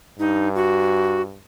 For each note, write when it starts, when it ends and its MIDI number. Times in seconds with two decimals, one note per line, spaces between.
0.19 1.41 43
0.19 0.49 63
0.55 1.22 66